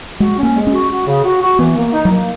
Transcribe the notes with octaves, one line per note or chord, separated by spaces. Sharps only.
G#3 F#4
C#4
A#3
G#3
C#4 F#4
F#4
C#3
F#4
F#4
E3 B3
A#3
D#4
F#3
A#3